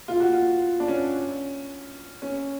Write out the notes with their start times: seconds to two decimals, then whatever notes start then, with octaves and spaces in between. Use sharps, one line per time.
0.08 F4
0.20 F#4
0.34 F4
0.80 D4
0.88 C#4
2.22 C#4